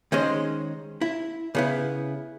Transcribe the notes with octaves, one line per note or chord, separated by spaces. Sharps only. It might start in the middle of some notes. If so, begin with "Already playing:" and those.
D#3 G#3 C#4 C5 D#5
E4
C#3 B3 E4